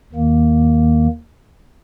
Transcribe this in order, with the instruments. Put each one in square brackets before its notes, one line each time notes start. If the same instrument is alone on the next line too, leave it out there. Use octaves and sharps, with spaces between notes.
[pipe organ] D#2 D#3 A#3